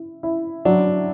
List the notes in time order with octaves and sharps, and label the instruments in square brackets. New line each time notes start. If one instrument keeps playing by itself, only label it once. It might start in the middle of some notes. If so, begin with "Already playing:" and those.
Already playing: [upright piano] E4
E4
[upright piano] F#3 [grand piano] D4